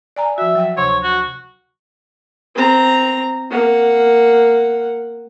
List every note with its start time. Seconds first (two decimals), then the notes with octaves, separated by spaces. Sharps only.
0.16 D5 G#5 A#5
0.38 F3 F#4 E5
0.55 F#3 G5 E6
0.77 D2 C3 C#5 C6
1.03 F#4
2.55 C4 A#5
3.50 A#3 F#5